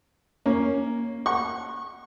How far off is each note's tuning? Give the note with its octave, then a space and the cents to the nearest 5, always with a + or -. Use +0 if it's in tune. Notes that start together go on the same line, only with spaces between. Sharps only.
A#3 +0 C#4 +0
F#5 +0 C#6 -25